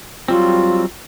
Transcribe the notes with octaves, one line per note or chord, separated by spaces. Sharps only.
F#3 G3 C4 F4